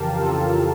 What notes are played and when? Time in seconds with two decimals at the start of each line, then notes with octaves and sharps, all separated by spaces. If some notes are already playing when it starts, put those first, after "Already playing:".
Already playing: F2 C#3 E3 G4 A#4 F5 A5
0.20 F4 A4